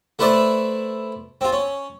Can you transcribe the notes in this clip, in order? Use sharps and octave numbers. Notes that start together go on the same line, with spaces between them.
A3 E4 B4 C5 D5 E5
C4 F4
C#4